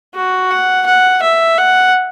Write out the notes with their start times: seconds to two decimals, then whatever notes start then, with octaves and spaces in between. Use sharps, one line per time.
0.15 F#4
0.50 F#5
0.86 F#5
1.23 E5
1.58 F#5